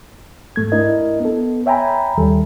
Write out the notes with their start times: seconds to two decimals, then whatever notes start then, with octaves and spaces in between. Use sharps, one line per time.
0.56 G#2 A3 G#6
0.72 D4 E4 A#4 D#5
1.20 B3 A4
1.66 C#5 E5 G5 G#5 A#5 B5
2.17 D#2 D#3 G3 A4